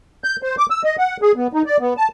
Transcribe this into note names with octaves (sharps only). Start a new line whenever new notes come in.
G6
C5
D6
E6
D#5
F#5
G#4
B3
D#4
D5
B3
A5